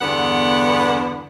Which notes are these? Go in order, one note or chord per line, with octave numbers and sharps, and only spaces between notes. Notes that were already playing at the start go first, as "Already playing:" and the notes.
E2 G2 D3 B3 F#5